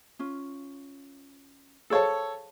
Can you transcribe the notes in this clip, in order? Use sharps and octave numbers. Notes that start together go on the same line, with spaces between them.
C#4 F4
G#4 A4 C5 C#5 F5 A5